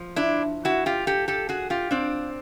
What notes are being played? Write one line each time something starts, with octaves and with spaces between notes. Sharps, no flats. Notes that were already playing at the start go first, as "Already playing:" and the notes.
Already playing: F3
D4 E4
E4 F#4
F4 G4
G4 A4
G4 A4
F#4 G#4
F4 G4
C4 D4